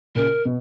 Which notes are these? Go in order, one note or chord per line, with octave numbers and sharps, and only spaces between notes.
A#2 C#3 A#4
B2